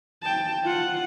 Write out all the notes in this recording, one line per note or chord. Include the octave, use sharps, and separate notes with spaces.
G5 A5
F4 F#5